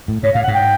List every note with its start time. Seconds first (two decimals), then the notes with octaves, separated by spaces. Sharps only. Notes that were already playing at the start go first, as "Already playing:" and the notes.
0.08 A2
0.23 G#2 C#5
0.34 A2 F5
0.43 F#5
0.48 G#2
0.54 G5